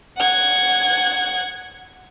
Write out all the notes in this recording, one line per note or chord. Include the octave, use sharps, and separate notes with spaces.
F#5 G#6